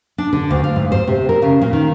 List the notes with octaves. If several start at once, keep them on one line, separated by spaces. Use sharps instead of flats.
D4
D3
D2
F5
G#2
C5
C3
A#4
C#3
A#2
D#3